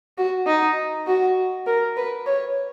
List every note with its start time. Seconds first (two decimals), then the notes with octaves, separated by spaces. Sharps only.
0.18 F#4
0.47 D#4
1.07 F#4
1.67 A#4
1.97 B4
2.26 C#5